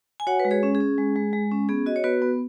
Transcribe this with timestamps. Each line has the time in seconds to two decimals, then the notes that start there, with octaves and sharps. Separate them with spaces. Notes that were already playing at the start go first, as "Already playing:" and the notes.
0.20 G#5
0.27 F#4 C#5 F#5
0.40 B4
0.45 G#3
0.51 G#4 C#5
0.63 C#4
0.75 G#4
0.80 C#4
0.98 G#3
1.16 G#3
1.33 G#3
1.51 C#4
1.69 B3 G#4
1.86 F#4 D#5
1.96 C#5
2.04 B3 F#4 B4
2.22 B3